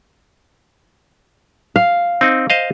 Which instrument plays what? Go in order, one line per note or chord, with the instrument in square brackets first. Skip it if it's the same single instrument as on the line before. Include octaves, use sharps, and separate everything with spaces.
[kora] F5
[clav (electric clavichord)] C4 D#4
C5 D#5 F5